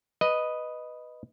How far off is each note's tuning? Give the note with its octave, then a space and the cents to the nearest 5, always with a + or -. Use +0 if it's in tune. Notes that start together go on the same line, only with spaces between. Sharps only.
B4 +0 D#5 +0